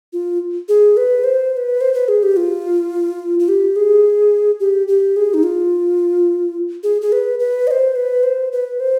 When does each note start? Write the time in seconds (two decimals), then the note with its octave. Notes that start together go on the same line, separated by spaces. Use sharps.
0.13 F4
0.69 G#4
0.97 B4
1.24 C5
1.52 C5
1.57 B4
1.81 C5
1.94 B4
2.08 G#4
2.23 G4
2.37 F4
3.40 F4
3.48 G4
3.76 G#4
4.60 G4
4.88 G4
5.16 G#4
5.34 D#4
5.43 F4
6.83 G#4
7.02 G#4
7.12 B4
7.39 B4
7.67 D#5
7.71 C5
7.96 B4
8.23 C5
8.52 B4
8.80 C5